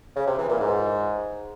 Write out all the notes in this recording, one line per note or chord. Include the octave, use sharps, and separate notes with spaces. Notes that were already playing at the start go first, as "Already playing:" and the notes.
C#3
C3
E3
A#2
G#2